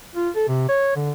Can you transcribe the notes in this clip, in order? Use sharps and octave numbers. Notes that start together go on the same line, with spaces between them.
F4
A4
C3
C#5
D3